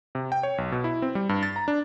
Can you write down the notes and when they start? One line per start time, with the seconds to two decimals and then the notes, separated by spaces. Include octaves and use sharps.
0.15 C3
0.32 G5
0.43 C#5
0.58 B1
0.72 B2
0.84 E4
1.02 C4
1.15 G3
1.29 G2
1.43 A6
1.56 A#5
1.68 D4